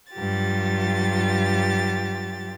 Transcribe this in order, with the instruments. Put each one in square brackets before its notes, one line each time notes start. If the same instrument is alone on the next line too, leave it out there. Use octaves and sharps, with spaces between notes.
[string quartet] G2 F#3 F4 G4 A6